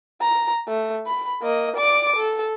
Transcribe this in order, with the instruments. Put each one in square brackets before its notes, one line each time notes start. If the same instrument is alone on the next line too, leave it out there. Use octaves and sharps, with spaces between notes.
[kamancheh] A#5
A3
B5
A#3 D#5
D5 D6
A4